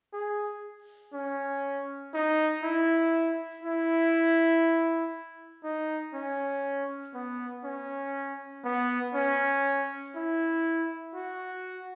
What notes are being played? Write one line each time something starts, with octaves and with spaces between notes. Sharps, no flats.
G#4
C#4
D#4
E4
E4
D#4
C#4
B3
C#4
B3
C#4
E4
F#4